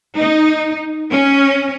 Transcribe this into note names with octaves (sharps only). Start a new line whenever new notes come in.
D#4
C#4